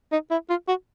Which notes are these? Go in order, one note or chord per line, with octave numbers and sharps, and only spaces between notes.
D#4
E4
F4
F#4